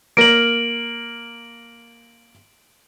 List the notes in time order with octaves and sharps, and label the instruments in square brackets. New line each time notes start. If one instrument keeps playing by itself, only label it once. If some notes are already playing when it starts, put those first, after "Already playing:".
[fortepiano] A#3 A#4 [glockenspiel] D7 F#7